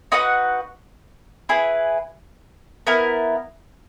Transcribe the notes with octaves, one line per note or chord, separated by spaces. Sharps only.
D#4 F#4 B4 F#5
E4 G#4 B4
B3 E4 A#4